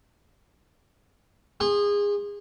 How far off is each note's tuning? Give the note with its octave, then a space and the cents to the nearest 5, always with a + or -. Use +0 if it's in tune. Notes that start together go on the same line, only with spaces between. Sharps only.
G#4 -25 C6 +30